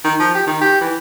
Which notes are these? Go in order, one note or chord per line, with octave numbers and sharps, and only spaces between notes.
D#3
F3
G4
D#3
G4
E3